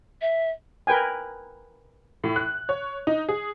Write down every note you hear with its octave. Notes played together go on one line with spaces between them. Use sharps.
E5
A#4 B4 G5 G#5
A2
F#6
C#5
D#4
G#4